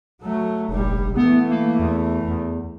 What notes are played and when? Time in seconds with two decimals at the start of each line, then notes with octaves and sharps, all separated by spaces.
0.21 F#3 A3
0.69 F1 A#1 G3
1.17 E3 A3 B3
1.50 A#3
1.80 E2
2.29 E2